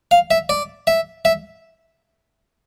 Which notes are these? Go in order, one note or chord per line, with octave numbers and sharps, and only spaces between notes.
F5
E5
D5
E5
E5